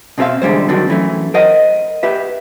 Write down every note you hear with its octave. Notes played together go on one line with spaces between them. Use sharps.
B2 C4 G#4 E5 F5
E2 D3 G3 G#3 C5
D3 D#3 F#3 C4 D4
F#2 E3 A3
A#4 C5 D#5 F#5
G4 B4 E5